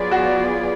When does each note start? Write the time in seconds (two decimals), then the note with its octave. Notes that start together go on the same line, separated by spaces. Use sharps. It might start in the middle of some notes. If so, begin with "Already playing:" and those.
Already playing: F#3 B3 F4 G#4 D5
0.11 F#4